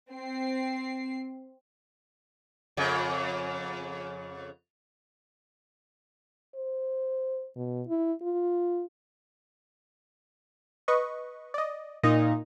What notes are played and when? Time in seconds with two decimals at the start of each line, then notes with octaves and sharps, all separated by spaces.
0.11 C4 C7
2.77 F2 C#3
6.55 C5
7.56 B2
7.88 E4
8.22 F4
10.88 B4 D#5 C#6
11.54 D5 D#5
12.03 A#2 D#4 D#5